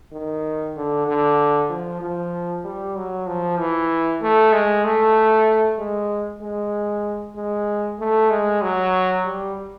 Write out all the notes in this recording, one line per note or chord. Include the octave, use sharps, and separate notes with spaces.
D#3
D3
D3
F3
F3
G3
F#3
F3
E3
A3
G#3
A3
G#3
G#3
G#3
A3
G#3
F#3
G3